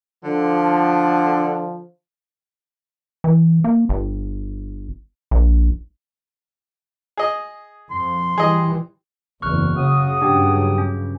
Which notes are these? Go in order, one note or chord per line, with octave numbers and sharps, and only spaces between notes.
D3 F3
E3
A#3
G1
A#1
G#4 D#5
F2 F3 C6
E3 G3 G#4 D#5
F#1 E2 C#6 F6 F#6
C#3 F#4 D#6
G2 C#3 F#3 D4 G4 G5
C#4